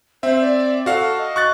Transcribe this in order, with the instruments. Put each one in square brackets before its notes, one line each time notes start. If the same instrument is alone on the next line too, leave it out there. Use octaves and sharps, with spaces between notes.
[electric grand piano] C4 E5 [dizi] C5
[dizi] D5
[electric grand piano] F#4 F5 [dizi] A4
[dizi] D#5
[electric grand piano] C#6 F#6 A6